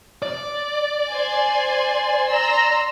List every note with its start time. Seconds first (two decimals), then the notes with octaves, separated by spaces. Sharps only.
0.22 D5
1.09 C5 G#5 C6
2.27 A#5 C6 E6